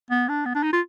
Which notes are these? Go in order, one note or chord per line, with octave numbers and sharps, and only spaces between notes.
B3
D4
B3
D4
D#4
F4